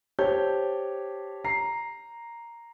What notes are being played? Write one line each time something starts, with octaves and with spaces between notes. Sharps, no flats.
G4 C5 C#5 A5 G6
A#5 C7